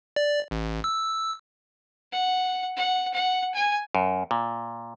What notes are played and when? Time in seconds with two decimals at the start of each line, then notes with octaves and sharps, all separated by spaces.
0.16 D5
0.51 A1
0.84 E6
2.13 F#5
2.77 F#5
3.13 F#5
3.55 G#5
3.95 F#2
4.31 A#2